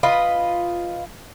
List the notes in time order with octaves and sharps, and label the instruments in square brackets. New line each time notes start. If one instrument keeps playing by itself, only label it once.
[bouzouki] F4 B4 D#5